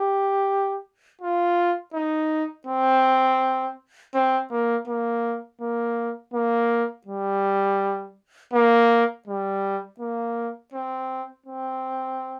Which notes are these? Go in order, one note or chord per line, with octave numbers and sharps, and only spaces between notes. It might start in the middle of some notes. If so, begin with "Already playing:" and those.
Already playing: G4
F4
D#4
C4
C4
A#3
A#3
A#3
A#3
G3
A#3
G3
A#3
C4
C4